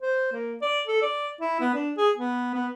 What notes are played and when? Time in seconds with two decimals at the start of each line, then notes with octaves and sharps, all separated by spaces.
0.02 C5
0.32 A#3
0.62 D5
0.87 A4
1.02 D5
1.40 E4
1.60 B3
1.74 D4
1.97 G#4
2.17 B3
2.54 B3